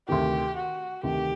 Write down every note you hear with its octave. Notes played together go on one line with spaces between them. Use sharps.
D2 C3 D#3 G4
F#4
D2 C3 D#3 G4